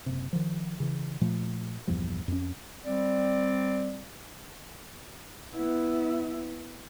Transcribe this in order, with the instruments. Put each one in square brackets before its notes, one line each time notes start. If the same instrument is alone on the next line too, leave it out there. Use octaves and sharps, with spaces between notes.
[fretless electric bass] F#1 C3
D#3 F3
C#3 E3
A#2 F3 A3
A#1 E2 G2 F3
F2 C#4
[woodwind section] G3 C4 D5
[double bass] B3 E4